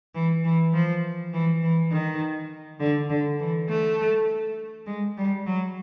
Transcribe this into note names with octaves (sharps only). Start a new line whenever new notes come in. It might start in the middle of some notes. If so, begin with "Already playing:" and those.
E3
E3
F3
E3
E3
D#3
D3
D3
E3
A3
G#3
G3
F#3